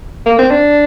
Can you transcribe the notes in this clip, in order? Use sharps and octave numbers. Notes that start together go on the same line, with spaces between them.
A#3
C4
D4